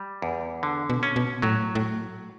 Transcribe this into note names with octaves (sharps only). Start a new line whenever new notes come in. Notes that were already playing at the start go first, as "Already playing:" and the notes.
Already playing: G3
E2
D3
B2
C#4
B2
A2 F#3
A2